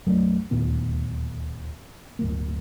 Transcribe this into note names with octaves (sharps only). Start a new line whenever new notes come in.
B1 F#2 F#3 A3
D1 D#2 A#2 B3
D1 G1 A#3